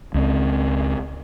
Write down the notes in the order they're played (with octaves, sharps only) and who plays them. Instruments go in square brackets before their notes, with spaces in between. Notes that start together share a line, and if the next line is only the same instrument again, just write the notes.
[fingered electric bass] C#2 C4